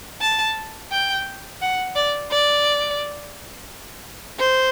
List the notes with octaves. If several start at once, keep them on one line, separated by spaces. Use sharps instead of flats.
A5
G5
F#5
D5
D5
C5